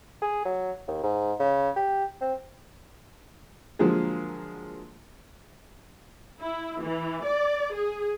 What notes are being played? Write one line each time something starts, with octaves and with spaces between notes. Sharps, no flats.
G#4
F#3
D#2
G#2
C#3
G4
C4
D3 F3 F#3 G#3 A#3 G#4
E4
E3
D5
G#4